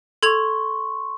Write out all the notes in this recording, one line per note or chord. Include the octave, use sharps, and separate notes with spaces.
A4 C6 C#6 G#6 F7